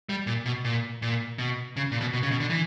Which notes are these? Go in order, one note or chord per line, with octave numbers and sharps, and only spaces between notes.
G3
A#2
B2
A#2
A#2
B2
C#3
A#2
B2
B2
C#3
B2
D3
E3